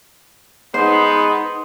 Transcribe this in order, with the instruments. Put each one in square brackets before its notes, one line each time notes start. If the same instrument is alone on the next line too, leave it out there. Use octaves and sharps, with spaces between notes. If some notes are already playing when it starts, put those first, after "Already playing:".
[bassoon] G#3 [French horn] B3 [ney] D#4 [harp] C5